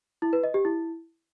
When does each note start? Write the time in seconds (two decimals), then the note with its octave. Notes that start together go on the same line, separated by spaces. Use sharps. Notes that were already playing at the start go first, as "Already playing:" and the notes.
0.22 E4
0.33 B4
0.44 D#5
0.54 G4
0.65 E4